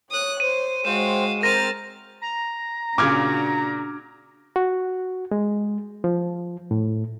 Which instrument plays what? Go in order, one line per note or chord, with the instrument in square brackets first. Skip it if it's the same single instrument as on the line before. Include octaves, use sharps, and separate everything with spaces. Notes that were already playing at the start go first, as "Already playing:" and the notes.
[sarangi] C#5 [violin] D#6 F#6
[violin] C5 [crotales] D#7
[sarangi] G#3 [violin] F#4 F5 [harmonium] C5 G5 [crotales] E7
[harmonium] C4 A#4 C5 [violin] F6 A6 [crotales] A#6 D#7
[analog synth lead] A#5
[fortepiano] A#2 C#3 [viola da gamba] D4 F#4 [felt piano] D6 F6 G#6
[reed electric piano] F#4
G#3
F3
A2